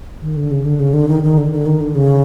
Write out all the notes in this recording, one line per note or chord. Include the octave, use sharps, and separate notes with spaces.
D#3
D3
C#3
D3
C#3
D3
D#3
D#3
D3
D3
D#3
D3
C#3